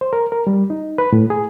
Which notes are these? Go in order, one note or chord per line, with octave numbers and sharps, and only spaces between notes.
C5
A#4
A#4
G3
D#4
B4
A2
G#4